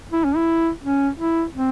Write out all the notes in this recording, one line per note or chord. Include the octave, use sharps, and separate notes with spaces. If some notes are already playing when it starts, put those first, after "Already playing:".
E4
C#4
E4
C#4
E4
C4